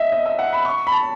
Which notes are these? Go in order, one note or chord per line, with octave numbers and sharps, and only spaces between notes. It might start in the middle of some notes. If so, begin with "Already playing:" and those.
Already playing: D#5 E5
D#5
E5
F#5
B5
C#6
B5
A5